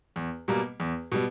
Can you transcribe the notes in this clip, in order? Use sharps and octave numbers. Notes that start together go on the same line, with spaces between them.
E2
B2 G3 A#3
E2
B2 G3